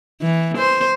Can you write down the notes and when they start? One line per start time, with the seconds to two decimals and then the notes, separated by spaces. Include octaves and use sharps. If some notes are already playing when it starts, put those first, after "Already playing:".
0.22 E3
0.58 C5